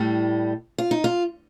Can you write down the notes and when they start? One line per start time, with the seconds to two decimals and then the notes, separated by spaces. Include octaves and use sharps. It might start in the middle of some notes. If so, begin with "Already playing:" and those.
Already playing: A2 G3
0.78 F4
0.91 D#4
1.04 F4